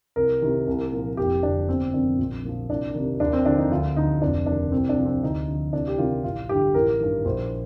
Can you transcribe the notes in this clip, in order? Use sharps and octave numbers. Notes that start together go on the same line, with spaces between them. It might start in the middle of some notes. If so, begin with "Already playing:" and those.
C2 A#4
C3 D#3
C2
A#2 F3
F1 G4
F2 D3 F3 D4
G1 C4
F2 C3 D#3 D4
A#1
A#2 F3
C2 D4
C3 D#3
D#2 D4
C4
D3 F3 D4
D#4
D2 F4
D3 F3 D#4
F1 D4
D#2 D#3 D4
C2 C4
D4
C3 F3
C4
D2 D#4
D3 F3
C2 D4
G4
C3 D#3 F4
A1 F4
G2 D3 G4
A1 A#4
G2 D#3
A#1 C5